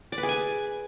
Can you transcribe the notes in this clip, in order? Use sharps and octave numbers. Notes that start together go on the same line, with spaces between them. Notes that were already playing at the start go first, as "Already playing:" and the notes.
D5
B4
G#4
G#5